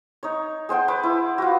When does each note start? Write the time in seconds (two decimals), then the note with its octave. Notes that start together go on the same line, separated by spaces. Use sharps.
0.23 D#4 C#5
0.69 G#4 C5 F#5 G5
0.88 B4 C5 D6
1.03 E4
1.38 F4 F#4